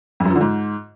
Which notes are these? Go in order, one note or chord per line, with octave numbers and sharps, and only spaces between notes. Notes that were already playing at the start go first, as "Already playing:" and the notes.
F2
F#2
F3
D3
G#2